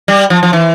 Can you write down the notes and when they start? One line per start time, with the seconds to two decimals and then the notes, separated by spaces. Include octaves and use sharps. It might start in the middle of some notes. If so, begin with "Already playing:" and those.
0.08 G3
0.30 F3
0.43 F3
0.53 E3